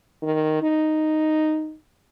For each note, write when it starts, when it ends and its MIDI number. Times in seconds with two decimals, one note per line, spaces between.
0.22 0.60 51
0.62 1.76 63